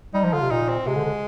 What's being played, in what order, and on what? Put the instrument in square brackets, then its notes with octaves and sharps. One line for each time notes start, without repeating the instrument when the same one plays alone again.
[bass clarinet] G3 [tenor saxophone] D#4
[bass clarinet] F3
[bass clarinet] D3 [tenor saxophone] F4
[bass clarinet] C3
[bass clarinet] A#2 [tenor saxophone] D#4
[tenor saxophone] C4
[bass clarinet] C3 [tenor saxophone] G#3
[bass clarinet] D3
D3